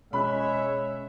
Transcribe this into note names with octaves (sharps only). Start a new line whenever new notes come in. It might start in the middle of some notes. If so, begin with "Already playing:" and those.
B2 G#3 C#4 C#5 E5 B5 F#6